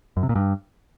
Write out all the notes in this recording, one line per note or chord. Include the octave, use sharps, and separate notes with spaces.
F#2
C3
A#2
G2